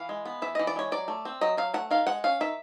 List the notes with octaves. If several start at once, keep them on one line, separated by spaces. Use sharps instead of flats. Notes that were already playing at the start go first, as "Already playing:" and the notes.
Already playing: E3 F5
G#3
B3
E3 E5
E3 D#5
D5
G#3 C#5
F#3 D5
A3
C4
F#3 D#5
F#3 F5
A3 F#5
D#3 F5
G#3 F#5
C#4 F5
D#3 E5